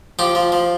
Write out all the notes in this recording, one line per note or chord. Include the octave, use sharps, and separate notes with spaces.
F3 G4
F3
F3